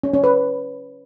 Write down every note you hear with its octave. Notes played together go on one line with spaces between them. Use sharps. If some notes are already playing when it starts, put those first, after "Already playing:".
C#4
C#4
B4